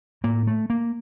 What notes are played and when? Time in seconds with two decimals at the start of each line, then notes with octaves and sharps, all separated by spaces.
0.24 A2 A#3
0.47 A3
0.70 A#3